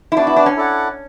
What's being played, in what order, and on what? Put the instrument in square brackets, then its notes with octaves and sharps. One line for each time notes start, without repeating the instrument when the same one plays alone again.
[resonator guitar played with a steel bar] E4
[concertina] B3 F#4 B4 D5 [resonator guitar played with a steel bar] D4
[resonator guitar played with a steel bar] E4
D4
C#4
[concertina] E4 A4 D5 F#5